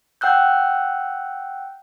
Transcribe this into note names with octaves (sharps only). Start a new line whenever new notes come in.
F#5 G5 E6 F#6 G6